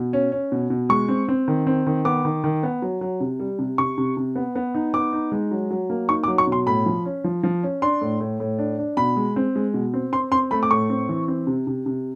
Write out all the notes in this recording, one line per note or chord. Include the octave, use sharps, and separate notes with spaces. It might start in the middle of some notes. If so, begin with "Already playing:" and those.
Already playing: B2
C#4
C#4
B2
B2
G#3 C#6
C4
C4
D#3
C4
D#3
B3 D6
D#3
D#3
B3
F#3
F#3
C3
G3
C3
C3 C#6
C3
C3
B3
B3
D#4
B3 D6
D#4
G#3
F#3
F#3
A#3
D#4 C#6
D6
F#3
C#6
B2
C6
A2 B5
F3
C#4
F3
F3
C#4
D4 C6
A2
A2
A2
D4
D4
B2 B5
G#3
C4
G#3
B2
C4
C4 C6
C4 C6
A3 B5
D6
A2 C#6
C4
E3
C4
C3
C3
C3